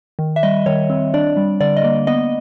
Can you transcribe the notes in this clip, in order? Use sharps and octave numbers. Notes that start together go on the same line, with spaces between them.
D#3
E5
G3 D#5
D#3 C#5
C4
D4 D5
G3
D3 D5
D#5
A#3
B3 D#5